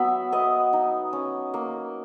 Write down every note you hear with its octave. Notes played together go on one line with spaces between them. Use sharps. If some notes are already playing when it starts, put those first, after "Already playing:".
Already playing: F#3 B3 E5
B3 D#5
D#4
C#4
A#3